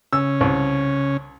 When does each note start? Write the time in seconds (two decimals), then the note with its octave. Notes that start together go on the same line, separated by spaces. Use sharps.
0.13 C#3 C#4 E6
0.41 C2